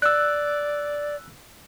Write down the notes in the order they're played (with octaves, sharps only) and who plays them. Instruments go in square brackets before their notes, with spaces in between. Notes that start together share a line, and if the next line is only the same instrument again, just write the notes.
[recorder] D5 [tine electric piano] E6 F#6